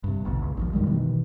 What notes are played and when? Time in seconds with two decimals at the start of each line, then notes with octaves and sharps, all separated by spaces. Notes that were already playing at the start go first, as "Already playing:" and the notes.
0.04 G2 C3
0.25 A1 D2 B2
0.42 C#2
0.57 A#1 D#2 F3
0.73 F#2 D#3 G3 G#3
0.87 B2 D#3 E3